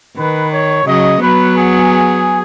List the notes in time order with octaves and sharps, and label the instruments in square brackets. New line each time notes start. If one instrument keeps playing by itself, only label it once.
[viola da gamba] D#3 [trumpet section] B4
[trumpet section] C#5
[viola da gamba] C#3 F#3 [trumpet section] D#5
[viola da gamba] F#3 B3 [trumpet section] B4
[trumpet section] G#4